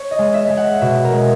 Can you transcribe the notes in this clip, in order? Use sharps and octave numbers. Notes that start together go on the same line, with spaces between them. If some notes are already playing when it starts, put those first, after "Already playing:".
Already playing: C#5
D#5
G#3
E5
G#3
F#5
B2 E5
A#4
G#3